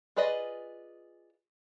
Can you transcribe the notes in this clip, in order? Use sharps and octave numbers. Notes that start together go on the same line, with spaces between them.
F4 G#4 B4 D5 D#5